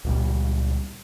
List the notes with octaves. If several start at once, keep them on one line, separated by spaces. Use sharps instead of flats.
C#2 A#2 G3